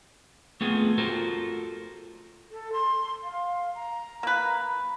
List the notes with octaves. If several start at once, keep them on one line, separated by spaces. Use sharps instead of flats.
A3 B3 C4 F4 G#4
F4 F#4 A4 A#4 C5
A4
C6
F5
A#5
A#3 B4